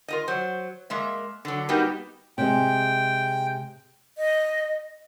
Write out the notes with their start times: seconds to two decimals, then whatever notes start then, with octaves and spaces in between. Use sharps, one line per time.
0.08 F4 A#4 D#5
0.28 F#3 C5
0.90 G#3 A#3 E5
1.45 D3 F#3
1.69 G3 A#3 B3 D#4 F#4 G4
2.38 C3 G#3 G5
4.18 D#5